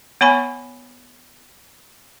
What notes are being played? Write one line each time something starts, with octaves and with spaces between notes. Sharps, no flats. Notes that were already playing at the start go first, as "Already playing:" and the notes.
B3 C#5 G#5 B5 C#6